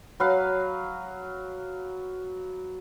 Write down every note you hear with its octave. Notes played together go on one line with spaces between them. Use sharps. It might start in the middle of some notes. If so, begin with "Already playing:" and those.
F#3 B4 F5